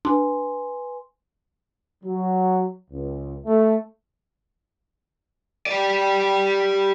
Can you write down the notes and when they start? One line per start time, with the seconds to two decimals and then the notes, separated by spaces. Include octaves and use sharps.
0.05 D4 B4 G#5 C6
2.04 F#3
2.91 C#2
3.46 A3
5.67 G4 D5